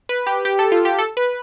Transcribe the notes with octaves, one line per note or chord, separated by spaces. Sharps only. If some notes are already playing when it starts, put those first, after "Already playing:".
B4
G4
G4
A4
F4
G4
A4
B4